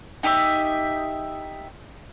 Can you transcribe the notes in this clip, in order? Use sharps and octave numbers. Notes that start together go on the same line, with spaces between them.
D#4 G4 D#5 E5